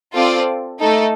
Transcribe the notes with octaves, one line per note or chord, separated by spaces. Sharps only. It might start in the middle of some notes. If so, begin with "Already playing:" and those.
C4 F4 A4 D5
A3 D#4 A4